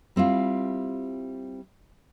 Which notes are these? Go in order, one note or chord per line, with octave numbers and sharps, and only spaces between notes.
G3 C4 E4 F4